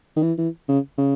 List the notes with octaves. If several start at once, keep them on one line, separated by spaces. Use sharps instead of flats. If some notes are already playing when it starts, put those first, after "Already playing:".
D#3
E3
E3
C#3
C#3